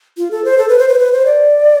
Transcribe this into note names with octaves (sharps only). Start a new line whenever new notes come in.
F4
A4
C5
A4
B4
C5
B4
C5
B4
C5
D5